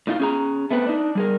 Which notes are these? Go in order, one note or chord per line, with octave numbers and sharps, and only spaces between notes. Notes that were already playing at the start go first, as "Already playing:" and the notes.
A2 D#4 F4
C#4 G#4 A#5
A3 B3 C4 B4
D4 D#4
G3 G#4 A#4